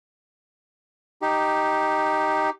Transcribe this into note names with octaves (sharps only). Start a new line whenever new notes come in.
D#4 G4